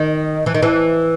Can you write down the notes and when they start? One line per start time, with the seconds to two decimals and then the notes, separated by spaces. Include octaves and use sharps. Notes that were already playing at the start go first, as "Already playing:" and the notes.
Already playing: D#3
0.46 E3
0.54 D#3
0.63 E3